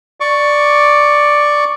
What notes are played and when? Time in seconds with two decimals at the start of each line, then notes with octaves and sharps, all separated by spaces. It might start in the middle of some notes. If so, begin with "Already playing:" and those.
0.20 D5 C#6 D6